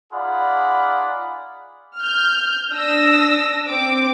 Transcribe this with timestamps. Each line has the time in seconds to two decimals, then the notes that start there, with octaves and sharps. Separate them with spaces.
0.13 D#4 F4 G#4 D5 F#5 B5
1.98 F6 G6
2.72 D4 D#6 E6 A#6
3.69 C4 D6